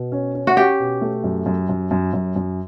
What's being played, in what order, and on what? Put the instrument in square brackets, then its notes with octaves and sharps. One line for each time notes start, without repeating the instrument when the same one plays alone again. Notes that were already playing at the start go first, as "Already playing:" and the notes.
Already playing: [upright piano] B2
C#4
C#4
[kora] F#4
[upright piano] C#4 [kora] G4
[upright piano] B2
A3
F#2
F#2
F#2
F#2
F#2
F#2